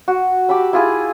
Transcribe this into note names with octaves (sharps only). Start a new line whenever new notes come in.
F#4
G4 A5 B5 E6
E4 F4 G#4